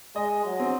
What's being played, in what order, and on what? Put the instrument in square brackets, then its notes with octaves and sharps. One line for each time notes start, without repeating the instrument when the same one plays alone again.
[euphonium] G#3 [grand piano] D#5
[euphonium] F#3
[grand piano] C4